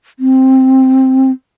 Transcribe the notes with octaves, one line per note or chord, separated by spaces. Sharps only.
C4